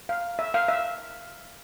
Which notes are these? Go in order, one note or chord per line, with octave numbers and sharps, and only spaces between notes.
F5
E5
F5
E5